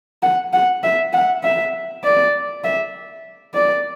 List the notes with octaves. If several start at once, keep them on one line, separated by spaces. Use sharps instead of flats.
F#5
F#5
E5
F#5
E5
D5
E5
D5